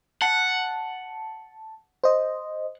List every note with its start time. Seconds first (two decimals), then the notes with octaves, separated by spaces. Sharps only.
0.22 F#5 A5
2.04 C5 D#5